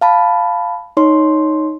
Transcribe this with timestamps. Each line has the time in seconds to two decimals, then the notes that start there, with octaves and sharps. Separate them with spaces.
0.01 F5 A5 B5
0.97 D#4 C#5 C6